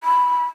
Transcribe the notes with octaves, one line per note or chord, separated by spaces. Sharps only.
B5